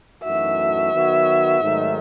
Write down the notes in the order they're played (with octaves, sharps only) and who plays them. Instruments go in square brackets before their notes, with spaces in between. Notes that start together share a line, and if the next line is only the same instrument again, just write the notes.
[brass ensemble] F#2 E3 A3 D#4 F#4 [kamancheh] E5
[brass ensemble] D#3 F#3 B3 F#4 C#5
G#2 D#3 F#3 A3 D#4